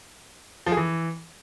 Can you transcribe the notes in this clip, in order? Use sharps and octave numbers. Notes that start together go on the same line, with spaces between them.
F3
G#4
E3